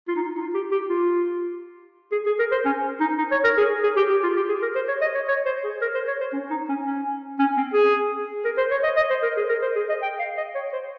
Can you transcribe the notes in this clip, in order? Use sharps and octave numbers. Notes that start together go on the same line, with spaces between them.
F4
D#4
F4
D#4
F4
G4
G4
F4
G#4
G#4
A#4
C5
C#4
D#4
D#4
C#5
A#4
G#4
G#4
G4
G4
F4
G4
G#4
A#4
C5
C#5
D#5
C#5
C#5
C5
G#4
A#4
C5
C#5
C5
C#4
D#4
C#4
C#4
C#4
C4
G#4
A#4
C5
C#5
D#5
D#5
C5
A#4
G#4
A#4
C5
G#4
D#5
G5
F5
D#5
C#5
C5